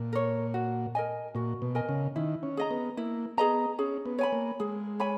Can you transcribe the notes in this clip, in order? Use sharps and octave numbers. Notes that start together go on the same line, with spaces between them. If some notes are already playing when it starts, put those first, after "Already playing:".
Already playing: A#2
A#4 C#5
F#4
A#4 D#5 G#5
A#2 F#4
B2
A#4 D#5 G#5
C#3
D#3 E4
C#4
G#4 D#5 A#5
B3
A#3 E4
B3 G#4 D#5 A#5
C#4 G#4
B3
C#5 G#5 B5
A#3
G#3 G#4
C#5 G#5 B5